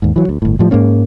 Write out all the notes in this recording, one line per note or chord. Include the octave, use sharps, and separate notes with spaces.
D#2 G#2
E3 F#3
D2
G1 A2
A2 F3 G3
G#2 G#3 A#3 C#4